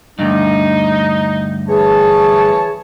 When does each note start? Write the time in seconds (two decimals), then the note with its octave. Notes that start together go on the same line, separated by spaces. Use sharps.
0.19 D2 G2 D#4
1.68 E3 G#4 C#5 A5